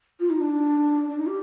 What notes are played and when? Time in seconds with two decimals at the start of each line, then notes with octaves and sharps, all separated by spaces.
0.20 F4
0.30 D#4
0.40 D4
1.09 D4
1.18 D#4
1.27 G4